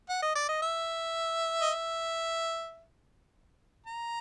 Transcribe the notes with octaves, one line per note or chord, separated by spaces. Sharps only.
F#5
D#5
D5
D#5
E5
D#5
E5
A#5